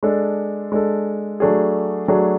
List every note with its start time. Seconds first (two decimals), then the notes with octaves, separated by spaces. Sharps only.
0.03 G#3 D4 A4
0.72 G#3 D4 A4
1.40 F#3 A3 D4 G#4
2.08 F#3 A3 D4 G#4